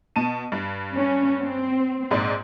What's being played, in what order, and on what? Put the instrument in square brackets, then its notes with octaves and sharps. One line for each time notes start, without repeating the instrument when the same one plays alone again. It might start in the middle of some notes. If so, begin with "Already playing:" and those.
[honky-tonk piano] B2 A5 D#7
G2
[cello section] C#4
C4
[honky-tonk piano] A#1 G#2 D5